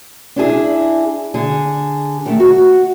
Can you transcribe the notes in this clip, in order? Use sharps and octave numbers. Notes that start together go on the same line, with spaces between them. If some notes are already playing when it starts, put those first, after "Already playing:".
D4 E4 G#4
D3 G#4
D#3 G#3 A3
F#4